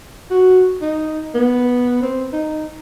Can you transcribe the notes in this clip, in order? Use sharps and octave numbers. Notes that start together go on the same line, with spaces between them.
F#4
D#4
B3
C4
D#4